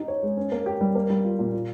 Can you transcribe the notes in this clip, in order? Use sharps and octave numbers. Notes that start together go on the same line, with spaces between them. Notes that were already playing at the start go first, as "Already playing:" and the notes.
Already playing: D#4 G4
C#5
G#3
C#4
A#3
G4
G3
A#3
G3
F4
A#2
F4